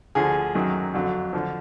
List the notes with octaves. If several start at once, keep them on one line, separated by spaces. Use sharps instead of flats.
D2 D3 F3 G#4
F#2 D#3 F#3
F2 D3 F#3
D3 F3